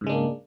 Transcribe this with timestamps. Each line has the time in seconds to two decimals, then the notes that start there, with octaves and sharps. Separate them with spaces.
0.01 G#2
0.04 C#3
0.07 G#3
0.09 D4
0.12 A#3